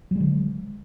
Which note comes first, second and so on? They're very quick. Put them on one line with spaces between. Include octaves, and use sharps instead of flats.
F#3 G#3 D3